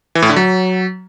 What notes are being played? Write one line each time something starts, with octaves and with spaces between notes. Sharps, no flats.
E3
A2
D3
F#3